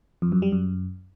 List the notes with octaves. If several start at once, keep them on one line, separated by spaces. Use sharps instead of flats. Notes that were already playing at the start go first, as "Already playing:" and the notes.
F2
F#2
G3
F#2